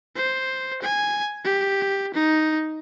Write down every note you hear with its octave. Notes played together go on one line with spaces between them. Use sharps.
C5
G#5
G4
D#4